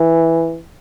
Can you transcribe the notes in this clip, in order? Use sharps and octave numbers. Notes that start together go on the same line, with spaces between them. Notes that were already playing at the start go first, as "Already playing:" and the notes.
Already playing: E3